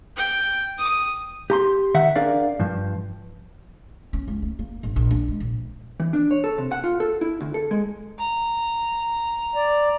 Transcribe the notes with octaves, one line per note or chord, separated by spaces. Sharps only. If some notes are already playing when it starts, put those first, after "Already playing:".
G5
D#6
G4 A#5 C6
D#3 E5 F#5
D4 G#4 A#4 D5 F5
G2 F3
C#4
C#2
A3
A#3
G1
A#1
D4
G#3
A#1
E3
D4
C#5
A4
C3
F#5
F4
A4
E4
D2
A4
G#3
A#5
D5